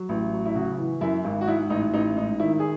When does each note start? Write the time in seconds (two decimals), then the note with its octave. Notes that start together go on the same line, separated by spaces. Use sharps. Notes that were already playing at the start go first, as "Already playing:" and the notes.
Already playing: F#3
0.09 A1
0.32 F#3
0.45 E4
0.55 C#3 F#4
0.78 E3
1.01 F#2 E4
1.24 G#1
1.41 F#4
1.47 G#2 E4
1.70 A1 D#4
1.94 A1 D#4
2.16 G#2 D#4
2.40 D#3 E4
2.60 G#4